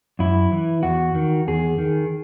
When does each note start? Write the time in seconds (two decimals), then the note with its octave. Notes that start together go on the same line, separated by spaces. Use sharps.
0.19 F#2 E4
0.52 E3
0.83 E2 F#4
1.15 D#3
1.47 E2 G#4
1.78 D#3